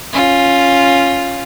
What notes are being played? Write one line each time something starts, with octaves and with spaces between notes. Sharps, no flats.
C#4 F4